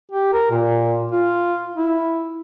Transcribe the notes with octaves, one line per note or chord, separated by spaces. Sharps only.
G4
A#4
A#2
F4
E4